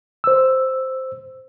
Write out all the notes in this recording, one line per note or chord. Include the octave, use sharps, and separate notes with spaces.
C5 E6